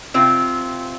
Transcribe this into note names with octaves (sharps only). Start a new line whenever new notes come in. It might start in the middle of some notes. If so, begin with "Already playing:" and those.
C3 C4 F4